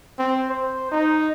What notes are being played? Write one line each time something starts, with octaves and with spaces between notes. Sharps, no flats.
C4
C5
D#4